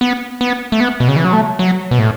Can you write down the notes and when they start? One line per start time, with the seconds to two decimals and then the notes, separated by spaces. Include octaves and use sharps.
0.01 B3
0.41 B3
0.72 A3
0.80 B3
1.00 B2
1.09 C#3
1.16 E3
1.25 F#3
1.33 A3
1.59 F#3
1.91 B2
1.99 A2